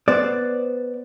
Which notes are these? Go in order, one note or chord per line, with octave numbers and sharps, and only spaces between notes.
B3 C5 D5